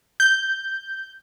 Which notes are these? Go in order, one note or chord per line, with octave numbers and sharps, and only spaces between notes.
G6